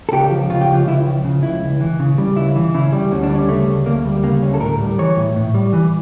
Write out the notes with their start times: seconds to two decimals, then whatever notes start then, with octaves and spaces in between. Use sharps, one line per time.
0.09 A4
0.12 C#2 G4
0.31 F3
0.50 C#3 F4
0.61 G4
0.69 C#2
0.74 F4
0.87 C#2 E4
1.06 F3
1.24 C#3
1.43 C#2 E4
1.61 C#2
1.80 E3
2.00 C#3
2.18 G3
2.36 C#2 E4
2.56 E3
2.74 C#3 E4
2.92 G3
3.11 D2 C#4
3.23 D4
3.30 G3
3.35 C#4
3.48 C#3 A3
3.67 D2
3.86 D2 A#3
4.05 G3
4.23 C#3 A#3
4.43 D2 C#4
4.54 A4
4.61 A2 A#4
4.80 G3
4.99 E3 C#5
5.17 A2
5.36 A2
5.54 G3
5.73 E3